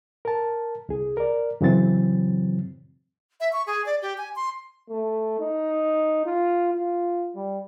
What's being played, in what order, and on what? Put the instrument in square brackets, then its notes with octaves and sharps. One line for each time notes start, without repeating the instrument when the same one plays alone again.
[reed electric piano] A#4 A5
C2 G#4
A#4 D5
F#2 C#3 E3 F#3 C4 A6
[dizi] E5
C#6
G#4
D5
G4
G#5
C6
[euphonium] A3
D#4
F4
F4
G3